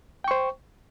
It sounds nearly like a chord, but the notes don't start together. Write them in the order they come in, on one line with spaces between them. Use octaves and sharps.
G5 C#6 C5